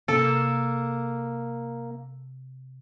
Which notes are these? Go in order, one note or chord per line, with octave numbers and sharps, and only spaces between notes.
C3 A#3 A4